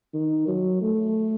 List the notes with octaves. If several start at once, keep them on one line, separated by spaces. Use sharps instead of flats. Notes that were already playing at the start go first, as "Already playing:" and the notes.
D#3
F#3
A3